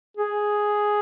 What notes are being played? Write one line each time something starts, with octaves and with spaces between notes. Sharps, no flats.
G#4